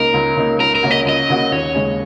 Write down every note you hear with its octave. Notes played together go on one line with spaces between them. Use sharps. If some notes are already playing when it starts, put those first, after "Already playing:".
Already playing: C#2 C#3 A#3 D#4 A#4
C#2
C#3 A#3 D#4
C#2 A#4
A#4
C#3 A#3 C#4 F#4
D#5
C#2 D#5
C#3 A#3 C#4 F#4
D#2 C#5
C#3 G#3 C#4